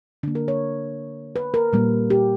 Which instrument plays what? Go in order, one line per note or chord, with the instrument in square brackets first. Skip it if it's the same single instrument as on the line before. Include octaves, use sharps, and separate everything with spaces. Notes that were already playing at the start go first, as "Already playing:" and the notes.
[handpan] D3 A#3 D4
A#4
C#5
B4
A#4
A#2 G3 A#3
G4